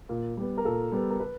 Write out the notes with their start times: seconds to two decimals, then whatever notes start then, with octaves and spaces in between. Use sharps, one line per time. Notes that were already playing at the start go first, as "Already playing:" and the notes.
0.09 A#2
0.37 G3 B3
0.58 A#4
0.65 A#2 A4
0.92 G3 B3
1.10 A#4
1.20 B4